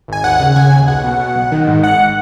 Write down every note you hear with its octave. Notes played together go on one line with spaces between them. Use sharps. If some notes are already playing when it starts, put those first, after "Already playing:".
G#1 G#5
D#2 F#5
C#3
F#5
C#3 G#5
D#2
B1 F#5
B2
B2
B1
D#3
G#2
G#1 F#5